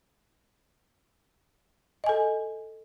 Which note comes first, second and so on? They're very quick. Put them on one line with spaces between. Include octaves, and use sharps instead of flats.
D#5 G#5 A4